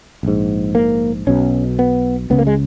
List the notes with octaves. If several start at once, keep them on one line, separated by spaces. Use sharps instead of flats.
A#1 G#2
A#3
B1 B2 C#4
B3
C#2 C#3 B3
A#3
G#3